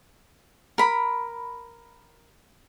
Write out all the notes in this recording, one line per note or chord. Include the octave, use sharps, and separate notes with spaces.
A#4 B5